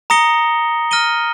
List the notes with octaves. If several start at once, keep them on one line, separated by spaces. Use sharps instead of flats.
A#5 D#6 A#6 C#7 G7
F6 A#6 D#7 G7